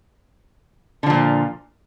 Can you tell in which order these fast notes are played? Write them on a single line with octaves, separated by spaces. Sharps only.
D3 F3 A#2